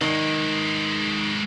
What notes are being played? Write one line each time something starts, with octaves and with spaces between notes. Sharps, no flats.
D#3 G#3 A#3